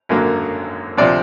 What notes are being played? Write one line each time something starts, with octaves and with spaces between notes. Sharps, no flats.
G#1 F#2 D3 F#3 A#3
D2 C3 F3 D5